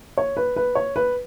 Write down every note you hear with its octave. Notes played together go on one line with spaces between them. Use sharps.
C#5
B4
B4
C#5
B4